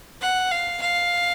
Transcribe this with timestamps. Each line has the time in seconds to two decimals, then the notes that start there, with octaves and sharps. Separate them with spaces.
0.21 F#5
0.51 F5
0.81 F5